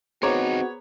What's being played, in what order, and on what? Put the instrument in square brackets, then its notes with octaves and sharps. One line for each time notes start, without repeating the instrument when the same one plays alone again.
[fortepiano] B3 C#5 [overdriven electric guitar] C4 D#4 [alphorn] F#4 [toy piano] G#4 C5 A#5